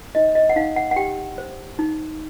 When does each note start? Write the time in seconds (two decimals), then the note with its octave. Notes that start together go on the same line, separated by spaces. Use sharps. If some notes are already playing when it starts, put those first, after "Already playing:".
0.15 D#4 D#5
0.35 D#5
0.49 F#5
0.56 D#4 F5
0.76 F#5
0.91 F#5
0.96 G4 G5
1.38 C5
1.79 D#4